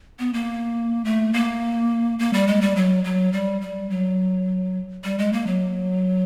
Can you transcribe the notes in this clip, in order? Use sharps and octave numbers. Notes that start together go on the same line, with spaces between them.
B3
A#3
A3
A#3
A#3
G3
G#3
G3
F#3
F#3
G3
G3
F#3
G3
G#3
A#3
F#3